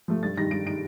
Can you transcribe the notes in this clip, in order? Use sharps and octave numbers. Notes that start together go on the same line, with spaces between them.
F3 A3
G2 A6
D#3 G3 A#6
G2 D7
D#3 G3 D7